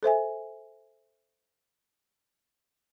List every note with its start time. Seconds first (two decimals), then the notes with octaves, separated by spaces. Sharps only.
0.03 A4 C5 E5 G#5